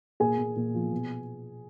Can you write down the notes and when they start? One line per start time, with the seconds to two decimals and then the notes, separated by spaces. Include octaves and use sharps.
0.20 A#2 G#4 G#5
0.38 A#2
0.56 A#2
0.74 F3
0.92 B2